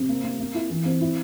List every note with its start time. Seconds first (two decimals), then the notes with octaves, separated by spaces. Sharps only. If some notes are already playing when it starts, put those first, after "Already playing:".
Already playing: C3
0.09 A#3
0.24 A#3
0.40 A#3
0.55 E4
0.70 E3
0.85 C4
1.01 E4